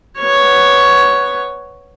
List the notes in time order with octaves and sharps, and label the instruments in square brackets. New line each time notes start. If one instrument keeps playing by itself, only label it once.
[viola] B3 C#5